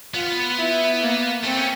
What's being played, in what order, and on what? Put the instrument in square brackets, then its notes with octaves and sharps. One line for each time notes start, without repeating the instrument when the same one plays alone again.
[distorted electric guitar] B3 [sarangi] F4
[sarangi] E4
A#3
[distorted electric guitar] A3 [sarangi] C4
[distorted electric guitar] C#4